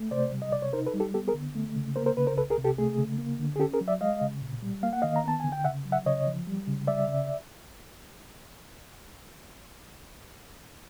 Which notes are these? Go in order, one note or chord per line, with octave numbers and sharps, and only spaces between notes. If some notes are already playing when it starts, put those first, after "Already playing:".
Already playing: A3
C3 C5 D5
G3
D#5
C3 D5
C#5
D#4 A#4 C5
A4 B4
G3
G4 A4
B3 G4 A4
G#4 A#4
D3
A3
C#3
A#3 A#4 C5
A#4 C5
C#3 B4
A#4 C5
C2 A4 B4
G#4 A#4
C3
G4 A4
A3 G#4
C#3
A#3
D3
G#4
C#4 G4 A4
G#4 A#4
F#3
D5 E5
G#3 D#5 F5
C#3
A#2
G3
A#3 F5
F#5
D#3 D#5 F5
A#5
B3 A5
D3 G#5
G5
C#3 E5 F#5
F#3
E5 F#5
C#3 C#5 D#5
F3
G3
C#3
G3 D5 E5
C#3